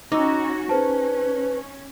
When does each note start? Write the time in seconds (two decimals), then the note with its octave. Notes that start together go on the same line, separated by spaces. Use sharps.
0.12 C#4 D#4 F#4 D6 E6
0.69 C#4 G#4 B4 C5 A5